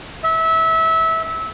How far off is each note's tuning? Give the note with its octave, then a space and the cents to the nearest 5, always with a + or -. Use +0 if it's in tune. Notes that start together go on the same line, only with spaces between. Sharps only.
E5 -20